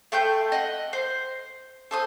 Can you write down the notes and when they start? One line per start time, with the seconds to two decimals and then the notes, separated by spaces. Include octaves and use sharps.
0.12 A3 G5 C6 G6
0.52 D#5 F#5
0.93 C5
1.91 A4 C5 D#6